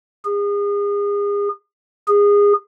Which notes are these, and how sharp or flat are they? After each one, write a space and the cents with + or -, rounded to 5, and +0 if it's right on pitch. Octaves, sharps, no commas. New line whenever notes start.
G#4 -35
G#4 -25